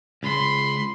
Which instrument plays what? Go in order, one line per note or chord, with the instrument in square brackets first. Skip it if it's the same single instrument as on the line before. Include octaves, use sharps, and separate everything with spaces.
[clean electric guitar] C#2 [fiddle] B5 C6